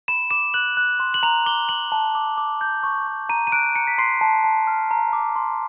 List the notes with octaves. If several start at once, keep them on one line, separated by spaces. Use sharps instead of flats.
B5 E7
D6 E7
F#6 F#7
F#6
C6
F#7
A#5 F7
D6 G7
A#5 F#7
A5
D6
D6
G6
C#6
C#6
A#5 D#7
D#7
F#6 D7
A#5 C#7
B6
C6 C7
A5
A5
F6
A#5
D6
C6